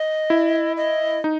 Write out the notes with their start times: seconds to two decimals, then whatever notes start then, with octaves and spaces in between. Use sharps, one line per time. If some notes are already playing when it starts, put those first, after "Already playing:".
Already playing: D#5
0.30 E4
0.77 D#5
1.24 D#4